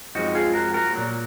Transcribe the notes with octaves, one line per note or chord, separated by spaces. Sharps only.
F#2 F3 G#3 C4 D#4 F#4
F4 G#4
F#4 A#4
F#4 A#4
A#2 F#3 A#3